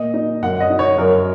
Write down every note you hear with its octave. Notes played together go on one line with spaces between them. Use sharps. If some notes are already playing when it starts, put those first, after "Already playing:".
Already playing: A#2 D#5
D#4
F#2 F#5
D#5
D#4
C#5
F#2 A#4